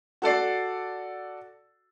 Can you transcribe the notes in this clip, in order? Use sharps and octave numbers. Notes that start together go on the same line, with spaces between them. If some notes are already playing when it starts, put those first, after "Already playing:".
F#4 A4 D5 C7